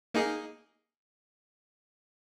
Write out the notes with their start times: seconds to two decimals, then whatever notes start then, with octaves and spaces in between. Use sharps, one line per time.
0.14 A#3 D#4 G#4